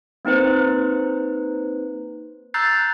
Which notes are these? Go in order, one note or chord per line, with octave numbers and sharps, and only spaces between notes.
A#3 C4 D#4 B4 C5
A#5 E6 F#6 G6 A6 C7